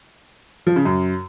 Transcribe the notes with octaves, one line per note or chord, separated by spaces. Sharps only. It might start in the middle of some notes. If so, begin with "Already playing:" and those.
F3
C#3
F#2